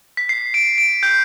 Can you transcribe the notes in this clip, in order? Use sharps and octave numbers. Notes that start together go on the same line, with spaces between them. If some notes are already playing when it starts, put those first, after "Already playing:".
B6
C7
D7
D7
G6